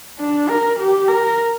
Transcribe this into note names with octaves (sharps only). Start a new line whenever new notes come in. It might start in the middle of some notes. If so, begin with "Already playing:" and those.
D4
A#4
G4
A#4